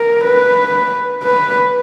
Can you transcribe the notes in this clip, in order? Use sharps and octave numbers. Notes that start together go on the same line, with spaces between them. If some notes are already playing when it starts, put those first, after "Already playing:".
Already playing: A#4
B4
B4